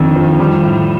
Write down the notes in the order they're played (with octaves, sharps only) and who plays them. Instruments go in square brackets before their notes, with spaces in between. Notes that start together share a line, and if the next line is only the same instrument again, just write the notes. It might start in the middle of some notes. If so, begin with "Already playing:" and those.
Already playing: [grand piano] F2 D3 F3 [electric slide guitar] D#3
[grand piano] F3
G3
A2